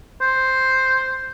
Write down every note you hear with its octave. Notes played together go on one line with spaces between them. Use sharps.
C5